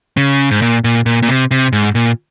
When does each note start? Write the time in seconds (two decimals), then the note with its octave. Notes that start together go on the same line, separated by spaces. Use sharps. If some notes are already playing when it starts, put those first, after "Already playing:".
0.17 C#3
0.51 G#2
0.62 A#2
0.84 A#2
1.06 A#2
1.23 A#2
1.28 C3
1.51 C3
1.73 G#2
1.95 A#2